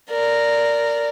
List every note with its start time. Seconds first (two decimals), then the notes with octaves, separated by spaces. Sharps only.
0.10 A#4 D5